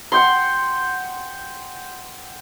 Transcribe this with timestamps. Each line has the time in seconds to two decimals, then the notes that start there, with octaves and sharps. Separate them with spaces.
0.12 F#5 G5 C6